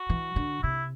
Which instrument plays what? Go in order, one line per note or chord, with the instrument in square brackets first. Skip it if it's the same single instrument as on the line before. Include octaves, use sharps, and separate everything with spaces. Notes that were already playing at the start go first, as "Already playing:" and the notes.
Already playing: [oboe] F#4
[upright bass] E3
D3
[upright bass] C3 [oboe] E4